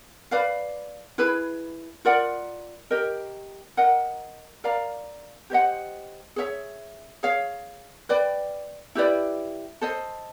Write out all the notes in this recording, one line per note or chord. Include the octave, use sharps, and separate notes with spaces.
B4 D5 F5
E4 G#4 B4
F4 A#4 D5 F#5
G4 A#4 D#5
A#4 D#5 F#5
A#4 D5 F5 A#5
G4 C5 D#5 F#5
G#4 C#5 E5
G#4 C#5 F5
B4 D5 G5
E4 G4 B4 D5
A4 C5 D#5